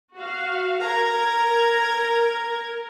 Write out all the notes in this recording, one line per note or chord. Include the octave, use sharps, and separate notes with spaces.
F#4 F5
A#4 A#5 G#6